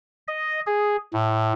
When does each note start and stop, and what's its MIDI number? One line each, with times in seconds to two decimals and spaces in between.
0.28 0.60 75
0.67 0.96 68
1.13 1.53 45